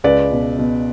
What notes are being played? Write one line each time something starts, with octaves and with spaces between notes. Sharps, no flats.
C#2 B4 D5
B2
B2